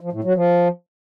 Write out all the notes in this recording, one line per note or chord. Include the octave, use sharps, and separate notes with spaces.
F3
A2
F#3
F3